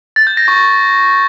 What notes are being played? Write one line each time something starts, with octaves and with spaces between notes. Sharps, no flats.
A6
G6
A#6
C#6